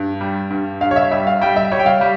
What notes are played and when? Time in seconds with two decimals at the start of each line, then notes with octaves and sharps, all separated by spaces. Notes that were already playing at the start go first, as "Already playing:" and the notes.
Already playing: G2
0.21 G3
0.50 G2
0.80 G2 F5
0.91 C#5
0.96 E5
1.11 G3 E5
1.27 F5
1.41 G3 G5
1.56 E5
1.71 G3 C#5
1.79 G5
1.86 F5
2.01 G3